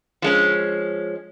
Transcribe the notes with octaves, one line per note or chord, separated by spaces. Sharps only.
F3 G#3 C#4